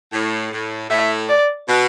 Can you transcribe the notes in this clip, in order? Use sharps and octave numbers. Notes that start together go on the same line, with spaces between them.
A2
A2
A2 E5
D5
B2